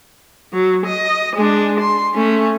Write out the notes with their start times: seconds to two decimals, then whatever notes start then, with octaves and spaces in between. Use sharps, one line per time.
0.53 F#3
0.86 D#5
1.36 G#3 D4
1.80 C6
2.14 A3 C#4